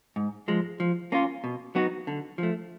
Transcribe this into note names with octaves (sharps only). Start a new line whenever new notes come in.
G#2
F3 G#3
F3
A#3 C#4 F4
B2
F#3 B3 D#4 F#4
D3
F3 A3